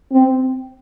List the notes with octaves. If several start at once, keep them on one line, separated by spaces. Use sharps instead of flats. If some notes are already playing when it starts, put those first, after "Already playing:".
C4